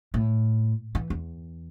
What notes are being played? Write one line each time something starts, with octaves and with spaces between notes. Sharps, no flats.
A2
E3
E2